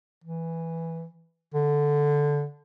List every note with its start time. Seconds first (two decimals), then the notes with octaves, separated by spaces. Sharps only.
0.24 E3
1.54 D3